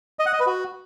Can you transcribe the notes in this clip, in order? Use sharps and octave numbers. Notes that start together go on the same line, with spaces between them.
D#5
F#5
D#5
B4
F#4